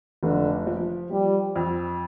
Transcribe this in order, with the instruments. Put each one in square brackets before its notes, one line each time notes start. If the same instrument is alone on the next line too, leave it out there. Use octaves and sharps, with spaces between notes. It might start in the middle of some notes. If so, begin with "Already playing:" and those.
[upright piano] F1 [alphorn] D3
[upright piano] F3
[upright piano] F3 [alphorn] G3
[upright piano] F2